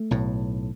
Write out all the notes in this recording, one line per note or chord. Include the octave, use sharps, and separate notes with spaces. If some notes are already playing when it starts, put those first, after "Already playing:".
Already playing: A3
B1 A2